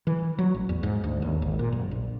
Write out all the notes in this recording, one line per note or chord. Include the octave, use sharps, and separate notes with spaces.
E3
F#3
A1
E2
G#2
D2
D#2
G#1
A#2
F#1
A#1